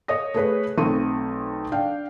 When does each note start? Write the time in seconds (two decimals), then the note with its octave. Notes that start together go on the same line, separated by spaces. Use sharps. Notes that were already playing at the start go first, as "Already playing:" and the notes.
0.08 C#5 D#5 D#6 A#6
0.34 A3 G#4 B4 C#5
0.78 B1 A3 C4 C#6 D#7
1.72 D4 F5 G5